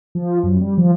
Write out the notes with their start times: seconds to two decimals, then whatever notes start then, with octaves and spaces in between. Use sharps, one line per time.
0.15 F3
0.43 F#2
0.61 G3
0.78 F3